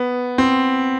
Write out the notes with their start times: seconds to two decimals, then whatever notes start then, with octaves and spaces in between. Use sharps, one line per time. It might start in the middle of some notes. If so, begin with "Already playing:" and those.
Already playing: B3
0.38 C4